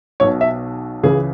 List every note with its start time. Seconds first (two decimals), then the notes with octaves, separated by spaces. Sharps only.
0.20 B1 B2 C#5
0.41 E5
1.03 C#2 C#3 E3 G#4